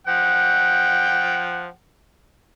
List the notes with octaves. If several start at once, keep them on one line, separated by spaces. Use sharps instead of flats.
F3 F#5 G5